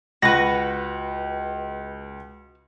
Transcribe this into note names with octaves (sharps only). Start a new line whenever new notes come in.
C#2 F#4 B4 A#6